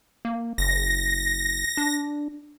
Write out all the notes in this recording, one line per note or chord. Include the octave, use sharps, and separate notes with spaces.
A#3
F#1 A#6
D4